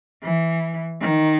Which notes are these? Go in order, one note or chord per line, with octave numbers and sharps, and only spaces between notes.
E3
D#3